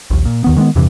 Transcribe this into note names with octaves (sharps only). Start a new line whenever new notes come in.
A#1 D#2
A#2
D#2 D#3 B3
D#3 G#3 A#3 B3
E2 G2 C3 E3